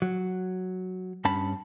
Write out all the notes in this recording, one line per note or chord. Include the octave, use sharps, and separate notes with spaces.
F#3
G2 C#4 A5 B5